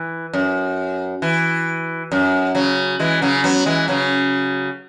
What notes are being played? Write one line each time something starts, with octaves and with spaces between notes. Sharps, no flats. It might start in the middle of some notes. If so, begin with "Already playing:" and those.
Already playing: E3
F#2
E3
F#2
C#3 F#3
E3 G#3
C#3 F#3
F#3 B3
E3 G#3
C#3 F#3